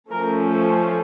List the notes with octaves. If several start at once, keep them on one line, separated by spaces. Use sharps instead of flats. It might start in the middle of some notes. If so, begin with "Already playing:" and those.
F3 A3 C#4 A#4
A4